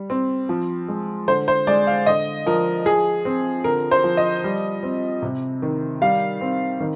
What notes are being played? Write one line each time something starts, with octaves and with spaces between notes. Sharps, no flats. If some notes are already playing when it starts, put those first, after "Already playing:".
Already playing: G3
C4
F3
G#3
D3 C5
C5
G#3 D5
F5
D3 D#5
F3 A#4
F3 G#4
C4
D3 A#4
C5
F3
D#5
G3
C4
C3
D#3
G3 F5
C4
D#3